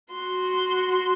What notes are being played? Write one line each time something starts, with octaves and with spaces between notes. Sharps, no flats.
F#4 C6